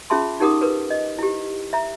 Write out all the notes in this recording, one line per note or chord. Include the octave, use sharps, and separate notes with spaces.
C#4 F4 G#4 E5 A5 C6
D#4 G4 A#4 F#5 D6 D#6
A#4 B4
D#5
E4 G4
E5 A#5